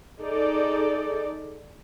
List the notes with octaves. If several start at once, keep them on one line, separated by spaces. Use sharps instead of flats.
D#4 G#4 A4 D5